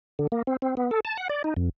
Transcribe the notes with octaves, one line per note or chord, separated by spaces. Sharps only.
D3
A#3
C4
C4
B3
A4
A5
F#5
D5
D#4
F2